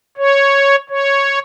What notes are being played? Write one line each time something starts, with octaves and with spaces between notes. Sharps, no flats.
C#5
C#5